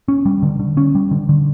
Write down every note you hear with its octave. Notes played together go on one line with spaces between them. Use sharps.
C#4
G3
D3
D3
C#4
G3
D3
D3